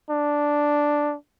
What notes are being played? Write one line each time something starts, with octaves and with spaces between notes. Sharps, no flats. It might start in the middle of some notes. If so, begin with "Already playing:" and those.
D4